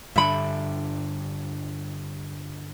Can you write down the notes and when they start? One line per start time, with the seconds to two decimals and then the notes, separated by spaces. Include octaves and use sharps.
0.16 G2 D3 E5 B5